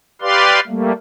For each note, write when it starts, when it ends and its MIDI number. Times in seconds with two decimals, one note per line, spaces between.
0.22 0.60 67
0.22 0.60 71
0.22 0.60 74
0.22 0.60 77
0.22 0.60 84
0.67 0.92 55
0.67 0.92 57
0.67 0.92 58